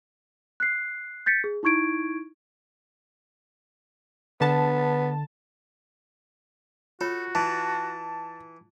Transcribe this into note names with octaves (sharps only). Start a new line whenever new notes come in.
F#6 C7
G6 A6 B6 C#7
G#4
D#4 E4 C#6 G#6 D7
D3 B3 A5
F4 F#4 A4 C#5 C#6
E3 A5